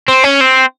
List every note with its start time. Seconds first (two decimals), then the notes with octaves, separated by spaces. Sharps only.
0.08 C4
0.24 C#4
0.41 C4